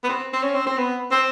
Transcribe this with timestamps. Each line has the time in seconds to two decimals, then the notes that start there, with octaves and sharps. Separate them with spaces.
0.04 B3
0.09 C4
0.33 C4
0.43 C#4
0.55 C4
0.66 C4
0.78 B3
1.12 C4